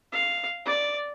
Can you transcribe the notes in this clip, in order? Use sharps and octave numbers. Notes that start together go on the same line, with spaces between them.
F5
D5